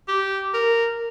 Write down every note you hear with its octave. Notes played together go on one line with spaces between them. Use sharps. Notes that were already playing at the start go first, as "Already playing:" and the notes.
G4
A#4